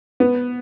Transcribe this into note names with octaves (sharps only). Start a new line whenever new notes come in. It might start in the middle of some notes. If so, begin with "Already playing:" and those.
B3